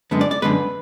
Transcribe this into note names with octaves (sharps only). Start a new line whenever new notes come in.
F#2 D3 G#3 B3
D5
D5
F#2 D3 G#3 B3 B4